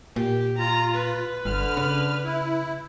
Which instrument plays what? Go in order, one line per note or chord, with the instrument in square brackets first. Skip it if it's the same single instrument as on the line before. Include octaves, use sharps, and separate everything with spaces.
[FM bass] A#2 [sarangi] G4
[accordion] F4 [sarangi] A#5
[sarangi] B4
[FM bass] G1 [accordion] D3 F6
[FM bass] C#3
[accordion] E4